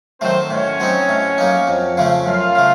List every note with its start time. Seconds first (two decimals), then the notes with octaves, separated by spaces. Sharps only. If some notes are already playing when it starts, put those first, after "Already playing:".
0.21 D#3 F#3 A3 C4 C5
0.50 A2 C#4 C#5
0.80 F#3 C4 D#4
1.09 A2
1.38 F#3 A#3 D#4
1.67 F2
1.97 C#3 F3 A3 C#4
2.26 F#2 F4 F5
2.55 C#3 A3